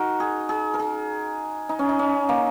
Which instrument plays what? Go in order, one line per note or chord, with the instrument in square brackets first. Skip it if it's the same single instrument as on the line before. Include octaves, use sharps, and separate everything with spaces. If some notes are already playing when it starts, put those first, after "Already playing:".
Already playing: [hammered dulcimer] D#4 F#4 A#4
G#4
G#4
A#4
G#4
D#4
C#4
D#4
C#4
A#3